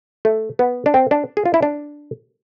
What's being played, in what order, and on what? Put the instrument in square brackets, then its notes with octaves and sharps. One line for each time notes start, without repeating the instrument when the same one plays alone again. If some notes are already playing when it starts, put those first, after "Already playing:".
[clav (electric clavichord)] A3
B3
D4
C4
D4
G#4
F4
E4
D4